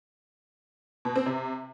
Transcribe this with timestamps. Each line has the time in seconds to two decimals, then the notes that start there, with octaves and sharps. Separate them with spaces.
1.05 B2
1.16 C4
1.26 C3